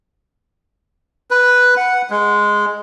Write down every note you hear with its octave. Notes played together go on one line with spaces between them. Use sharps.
B4
F#5
G#3